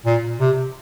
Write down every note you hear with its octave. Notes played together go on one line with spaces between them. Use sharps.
A#2
C3